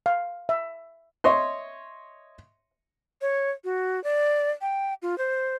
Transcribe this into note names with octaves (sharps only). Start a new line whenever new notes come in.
F5
E5
C#5 D#5 E5 C6
C#5
F#4
D5
G5
F4
C5